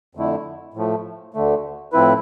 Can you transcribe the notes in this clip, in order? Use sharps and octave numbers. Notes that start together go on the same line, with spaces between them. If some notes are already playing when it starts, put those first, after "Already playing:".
F2 D3 A3 E4
A2 F3 A3
D2 D3 A3
A2 F3 C4 E4 B4